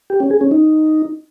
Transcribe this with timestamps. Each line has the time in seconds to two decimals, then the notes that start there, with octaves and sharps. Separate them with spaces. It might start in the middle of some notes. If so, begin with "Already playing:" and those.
0.10 G4
0.20 C#4
0.31 G#4
0.41 C#4
0.51 D#4